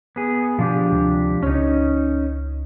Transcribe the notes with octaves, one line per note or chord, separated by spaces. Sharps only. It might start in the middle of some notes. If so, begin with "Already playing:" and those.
B3 G#4
B2 F3 D4 G4
D2 C3 G#3
C#2 C#4 D#4